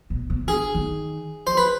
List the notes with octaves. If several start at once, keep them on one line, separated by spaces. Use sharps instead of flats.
B2
C3
D3 G#4
D#3
C5
B4